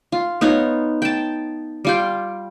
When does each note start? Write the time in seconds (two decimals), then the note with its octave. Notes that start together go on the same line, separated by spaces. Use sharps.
0.12 F4
0.41 B3 D#4 F4 C#5
1.02 G5 A5
1.85 G3 F4 G5